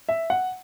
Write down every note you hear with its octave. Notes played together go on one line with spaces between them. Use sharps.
E5
F#5